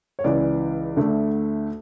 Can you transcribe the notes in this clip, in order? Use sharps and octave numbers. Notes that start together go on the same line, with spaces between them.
C#5
C#2 C#3 E3 D5
D2 D3 A3